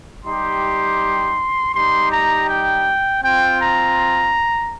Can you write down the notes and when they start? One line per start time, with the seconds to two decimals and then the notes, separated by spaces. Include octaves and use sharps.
0.24 G3 D#4 G4 C6
1.73 G3 D#4 G4 C6
2.11 A#5
2.48 G5
3.22 C4 F4 G5
3.61 A#5